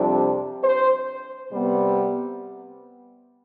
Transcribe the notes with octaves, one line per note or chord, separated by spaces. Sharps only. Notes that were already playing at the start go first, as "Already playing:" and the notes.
Already playing: F2 C3 G3 D4
C5
C3 G3 B3